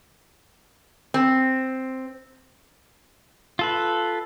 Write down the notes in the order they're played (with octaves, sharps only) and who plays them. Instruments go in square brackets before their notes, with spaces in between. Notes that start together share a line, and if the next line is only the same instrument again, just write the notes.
[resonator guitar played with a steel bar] C4
[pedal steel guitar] F4 A4 B4